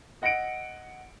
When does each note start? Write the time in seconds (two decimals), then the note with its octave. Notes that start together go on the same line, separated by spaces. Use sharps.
0.22 D#5 F#5 A#6 C#7 D7